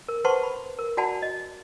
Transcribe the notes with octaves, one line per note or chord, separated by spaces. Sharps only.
A#4
B4 C5 F#5 A5 C6 C#6
B5
A#4
F#4 D5 F#5 G#5 A5 B5
D#5